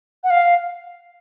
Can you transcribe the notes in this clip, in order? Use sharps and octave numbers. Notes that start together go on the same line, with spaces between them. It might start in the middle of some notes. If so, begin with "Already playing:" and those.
F#5
F5